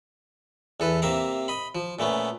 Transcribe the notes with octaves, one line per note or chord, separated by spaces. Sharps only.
E2 A4 B4
C3 A#3 E5 F5 A#5
D#5 B5
F3
A#2 A3 B3 C#4